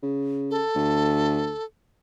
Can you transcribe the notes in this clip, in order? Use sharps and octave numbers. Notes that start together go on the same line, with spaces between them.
C#3
A4
D2